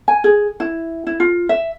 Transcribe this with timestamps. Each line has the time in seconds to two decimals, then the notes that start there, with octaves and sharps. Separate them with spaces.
0.08 G#5
0.24 G#4
0.60 E4
1.07 E4
1.20 F4
1.49 E5